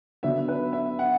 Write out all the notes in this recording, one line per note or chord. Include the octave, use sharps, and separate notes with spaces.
D3 F#3 B3 E5
B4
E5
F#5